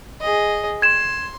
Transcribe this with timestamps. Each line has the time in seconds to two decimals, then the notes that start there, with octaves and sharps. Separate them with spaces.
0.21 G#4 D#5
0.82 C6 G#6 E7